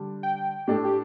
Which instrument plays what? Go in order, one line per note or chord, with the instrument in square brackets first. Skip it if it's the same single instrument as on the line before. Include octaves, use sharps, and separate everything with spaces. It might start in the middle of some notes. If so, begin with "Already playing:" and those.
Already playing: [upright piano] D3 G3 D4 G4
[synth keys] G5
[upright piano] A2 A3 D4 A4 [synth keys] G4
[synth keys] G4